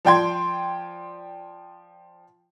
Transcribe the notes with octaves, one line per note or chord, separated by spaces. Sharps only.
F3 D5 G5 C6 G#6